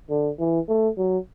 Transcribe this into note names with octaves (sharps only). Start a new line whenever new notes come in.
D3
E3
A3
F#3